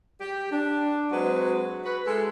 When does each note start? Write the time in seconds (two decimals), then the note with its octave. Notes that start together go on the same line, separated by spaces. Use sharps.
0.20 G4
0.51 D4
1.11 F#3 G#3 C4 F#4 B4
1.84 F#4 B4
2.05 G#3 E4 A4